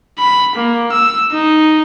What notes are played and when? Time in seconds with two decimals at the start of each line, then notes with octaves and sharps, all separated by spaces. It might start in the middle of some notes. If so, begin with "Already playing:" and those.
0.19 B5
0.55 A#3
0.92 E6
1.33 D#4